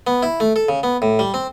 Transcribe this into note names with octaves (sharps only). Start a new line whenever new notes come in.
B3
E4
A3
A4
C#3
B3
A2
G3
C4